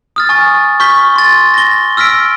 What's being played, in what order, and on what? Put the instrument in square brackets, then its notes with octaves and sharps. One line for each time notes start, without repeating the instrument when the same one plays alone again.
[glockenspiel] D#6 F6 A6
G#5 C#6 A6
C#6 F6 G6 B6 G7
C6 A6
A#6 G7
E6 F6 A#6 B6 D7